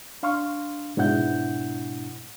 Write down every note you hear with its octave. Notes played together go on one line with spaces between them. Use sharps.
D4 F5 C6 C#6 F6
G#2 B2 D4 E4 F#5 G6